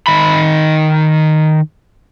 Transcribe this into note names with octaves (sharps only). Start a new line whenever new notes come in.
D#3 B5